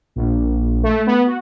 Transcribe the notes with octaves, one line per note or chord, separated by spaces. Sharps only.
A#1
A3
B3
F#4